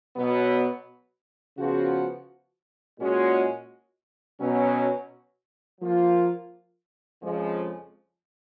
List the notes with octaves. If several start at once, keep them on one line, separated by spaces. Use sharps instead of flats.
B2 F#3 B3
C#3 F3 B3 F#4
A#2 G#3 C#4 F#4
B2 F#3 C#4
F3 A#3 F4
F2 C#3 F3 G#3